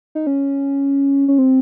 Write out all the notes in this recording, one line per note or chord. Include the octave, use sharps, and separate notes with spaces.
D#4
C#4
C#4
C4